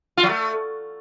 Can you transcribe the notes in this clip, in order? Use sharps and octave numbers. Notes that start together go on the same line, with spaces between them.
F4
F#3
A3